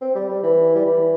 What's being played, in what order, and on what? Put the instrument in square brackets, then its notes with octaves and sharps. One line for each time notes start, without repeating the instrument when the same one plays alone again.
[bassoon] C4
G3
G3
E3
G3
E3